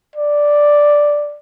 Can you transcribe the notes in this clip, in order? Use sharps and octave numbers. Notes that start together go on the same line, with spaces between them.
D5